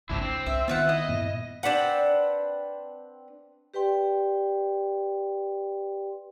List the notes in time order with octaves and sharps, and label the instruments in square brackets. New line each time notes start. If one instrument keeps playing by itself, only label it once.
[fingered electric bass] G#1 C#2 G#2 [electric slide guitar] C4 D4 E4
[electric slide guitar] C4 [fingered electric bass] D4
[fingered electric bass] C2 [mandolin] E5
[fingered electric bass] D#3 B3 [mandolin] F4 E5 F#5
[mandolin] E4 [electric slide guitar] D#5
[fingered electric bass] G2 A#2 B3
[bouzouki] C4 D4 B4 F#5
[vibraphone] G4 B4 D5 G5 C6